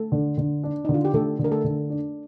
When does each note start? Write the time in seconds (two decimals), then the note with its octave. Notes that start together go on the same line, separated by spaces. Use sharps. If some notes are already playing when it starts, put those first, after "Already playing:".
Already playing: A3 A4
0.12 D3
0.38 D3
0.64 D4
0.85 D3 D#4
0.94 F4
1.05 G4
1.14 D3 A3 A4
1.39 D3
1.44 A#4
1.52 A3 A4
1.64 D3
1.90 D4